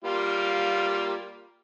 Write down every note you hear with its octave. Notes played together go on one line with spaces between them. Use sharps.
G3 A#3 F4